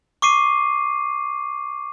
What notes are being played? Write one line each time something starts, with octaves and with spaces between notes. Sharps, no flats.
C#6 D6 C7 D#7